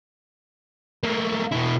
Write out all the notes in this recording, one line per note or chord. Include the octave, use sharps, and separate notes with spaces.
A3 A#3
B2 E4